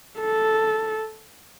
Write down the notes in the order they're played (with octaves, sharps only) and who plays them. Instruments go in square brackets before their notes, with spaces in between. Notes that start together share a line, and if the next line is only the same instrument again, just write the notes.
[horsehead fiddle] A4